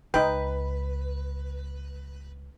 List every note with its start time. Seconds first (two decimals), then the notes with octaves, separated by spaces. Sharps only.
0.14 C#2 D#4 B4 G5